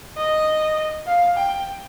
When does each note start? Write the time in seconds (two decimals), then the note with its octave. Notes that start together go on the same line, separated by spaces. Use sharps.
0.17 D#5
1.07 F5
1.36 G5